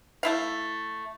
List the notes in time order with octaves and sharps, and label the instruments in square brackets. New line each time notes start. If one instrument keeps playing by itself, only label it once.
[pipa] A3 E4 F5